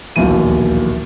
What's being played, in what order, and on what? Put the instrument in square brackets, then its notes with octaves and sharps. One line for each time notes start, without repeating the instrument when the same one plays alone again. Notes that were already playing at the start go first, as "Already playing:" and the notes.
[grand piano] D1 A#1 D#2 B2 E3 D#7